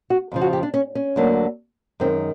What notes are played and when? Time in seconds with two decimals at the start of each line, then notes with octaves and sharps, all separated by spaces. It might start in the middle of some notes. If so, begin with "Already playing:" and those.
0.10 F#4
0.32 F2 C#3 F3
0.41 F#4
0.53 G4
0.63 D4
0.74 C#4
0.95 C#4
1.16 D2 D3 F#3 A#3
2.00 F#2 D#3 G#3 C4